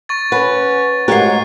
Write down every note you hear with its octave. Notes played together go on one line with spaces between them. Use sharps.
C#6 A6
C#4 B4 F#5
G#2 A3 F#4 G4 A#4 C#5 F#6 C7